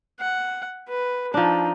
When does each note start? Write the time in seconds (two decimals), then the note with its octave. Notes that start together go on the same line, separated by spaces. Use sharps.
0.20 F#5
0.88 B4
1.34 F3 D4 D#4